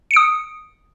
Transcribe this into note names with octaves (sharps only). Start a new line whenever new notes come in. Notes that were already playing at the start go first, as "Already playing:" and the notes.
D#6 C#7 D7